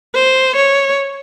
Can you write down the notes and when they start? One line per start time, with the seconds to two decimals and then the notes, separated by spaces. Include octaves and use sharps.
0.15 C5
0.56 C#5